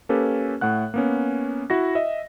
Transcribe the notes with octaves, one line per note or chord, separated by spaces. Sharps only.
A#3 C#4 G4 A4 B4
A2 A3 F#5 F#6
A#3 B3 C#4
E4 F#4 A#6
D#5 E5